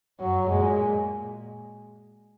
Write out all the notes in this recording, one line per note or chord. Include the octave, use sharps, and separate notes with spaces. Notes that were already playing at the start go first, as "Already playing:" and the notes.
F#2 F#3
A#2 G#3